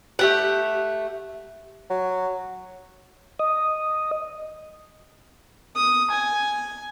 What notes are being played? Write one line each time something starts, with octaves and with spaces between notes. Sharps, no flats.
A3 G4 F#5
F#3
D#5
D#6
G#5